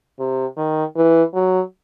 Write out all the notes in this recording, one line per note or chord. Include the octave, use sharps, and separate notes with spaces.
C3
D#3
E3
F#3